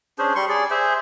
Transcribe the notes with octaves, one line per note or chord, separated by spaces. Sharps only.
C#4 D4 G#4 C5
G3 C6 C#6
G#4 D5
G#4 C5 E5